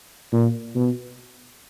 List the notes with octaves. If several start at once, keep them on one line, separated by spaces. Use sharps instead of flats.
A#2
B2